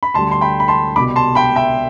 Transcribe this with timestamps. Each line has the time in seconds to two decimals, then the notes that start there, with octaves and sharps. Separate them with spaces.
0.03 B5
0.14 D2 D3 G3 A5 C6
0.32 C6
0.41 G5 B5
0.60 B5
0.68 A5 C6
0.96 C2 B2 G3 B5 D6
1.16 A5 C6
1.35 G5 B5
1.56 E5 G5